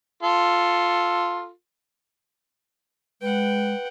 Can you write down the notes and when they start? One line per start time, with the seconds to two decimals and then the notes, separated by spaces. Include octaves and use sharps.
0.23 F4 A4
3.22 G#3 B4 F#5 G5